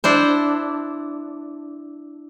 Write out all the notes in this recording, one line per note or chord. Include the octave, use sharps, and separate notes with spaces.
D4 E4 C5